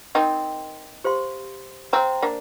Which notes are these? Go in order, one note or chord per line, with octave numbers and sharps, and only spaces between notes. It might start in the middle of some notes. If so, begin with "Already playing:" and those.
C4 D#4 A#4 D#5 G5
G4 C5 F5 C6
C4 C5 F5 A#5
A#3 D4